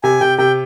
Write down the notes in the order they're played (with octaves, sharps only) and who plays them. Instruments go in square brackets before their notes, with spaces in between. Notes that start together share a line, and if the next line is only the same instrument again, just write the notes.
[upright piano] C3 [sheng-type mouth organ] G#5
[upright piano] C3 [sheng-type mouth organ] G5
[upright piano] C3 [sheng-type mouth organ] G5